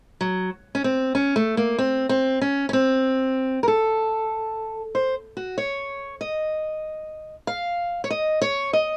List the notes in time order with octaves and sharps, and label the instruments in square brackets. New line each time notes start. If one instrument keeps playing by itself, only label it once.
[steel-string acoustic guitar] F#3
C#4
C4
C#4
A3
A#3
C4
C4
C#4
C#4
C4
A#4
A4
C5
F#4
C#5
D#5
F5
C#5
D#5
C#5
D#5